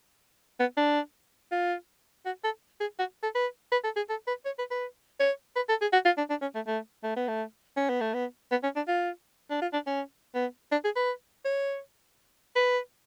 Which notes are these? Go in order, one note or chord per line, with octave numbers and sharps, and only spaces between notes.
B3
D4
F4
F#4
A4
G#4
F#4
A4
B4
B4
A4
G#4
A4
B4
C#5
B4
B4
C#5
B4
A4
G#4
F#4
F4
D4
D4
C#4
A3
A3
A3
B3
A3
C#4
B3
A3
B3
B3
C#4
D4
F4
D4
F4
D4
C#4
B3
D4
G#4
B4
C#5
B4